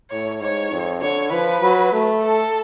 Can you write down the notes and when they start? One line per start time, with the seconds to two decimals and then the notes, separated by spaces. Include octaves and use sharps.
0.11 A2 C#5
0.41 G#2 C#5
0.71 F2
1.02 D3 C#5
1.31 F3 B4
1.61 F#3
1.92 A3
2.23 A4